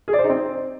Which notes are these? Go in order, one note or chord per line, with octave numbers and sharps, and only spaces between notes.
G#4
D5
C5
D#4
C4